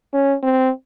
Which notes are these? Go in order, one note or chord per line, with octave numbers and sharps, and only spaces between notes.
C#4
C4